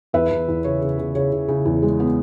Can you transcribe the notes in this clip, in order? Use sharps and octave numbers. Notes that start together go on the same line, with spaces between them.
E2 B4 E5
E2
E2
C#3 C#5
C#3
C#3
C#3 C#5
C#3
C#3
E2
G#3
B3